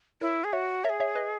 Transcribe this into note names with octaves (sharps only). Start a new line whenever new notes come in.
E4 A#4 C#5
G#4
F#4 C#5 E5
A#4 C#5 E5
G#4
C#5 E5
B4 D#5